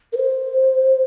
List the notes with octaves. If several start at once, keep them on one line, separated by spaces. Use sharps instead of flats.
A#4
C5